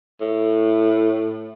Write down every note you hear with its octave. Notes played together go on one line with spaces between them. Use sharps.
A2